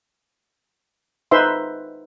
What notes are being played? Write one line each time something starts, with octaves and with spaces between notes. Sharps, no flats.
D#4 B4 C5 E5 C6